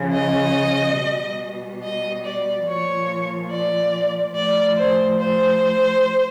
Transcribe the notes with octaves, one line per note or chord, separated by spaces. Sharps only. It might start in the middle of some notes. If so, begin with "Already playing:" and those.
Already playing: C#3 F3
D#5
B2 G3
D#5
D5
A#2 F3 C#5
D5
A2 F3 D5
C5
C5